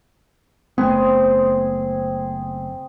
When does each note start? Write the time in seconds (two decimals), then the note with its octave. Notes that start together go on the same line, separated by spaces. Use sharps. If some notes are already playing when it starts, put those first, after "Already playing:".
0.78 F#1 A3 B3 C4 G#4